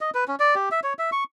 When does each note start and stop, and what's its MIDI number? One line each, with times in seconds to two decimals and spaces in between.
0.01 0.10 75
0.15 0.24 71
0.28 0.35 61
0.40 0.55 74
0.55 0.69 67
0.71 0.80 76
0.83 0.93 73
0.99 1.10 76
1.12 1.24 85